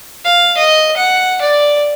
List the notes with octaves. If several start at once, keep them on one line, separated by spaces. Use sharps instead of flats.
F5
D#5
F#5
D5